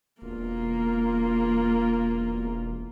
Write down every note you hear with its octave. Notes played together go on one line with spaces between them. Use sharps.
E1 A#3 F4